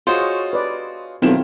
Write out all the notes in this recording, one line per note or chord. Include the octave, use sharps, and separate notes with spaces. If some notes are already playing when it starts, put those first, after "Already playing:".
F4 F#4 G#4 C5 C#5 D#5
B4 D5
B1 D#3 C4 E4 F4 A4 E7